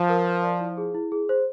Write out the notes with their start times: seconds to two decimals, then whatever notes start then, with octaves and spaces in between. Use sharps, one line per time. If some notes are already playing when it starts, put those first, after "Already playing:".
Already playing: F3
0.09 A#4
0.26 A#4
0.43 D5
0.60 E4
0.77 G#4
0.94 E4
1.12 G#4
1.29 C5